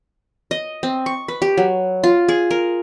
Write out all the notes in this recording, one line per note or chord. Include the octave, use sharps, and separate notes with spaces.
D#5
C4
C#6
B4
G4
F#3
F4
G#4
A#4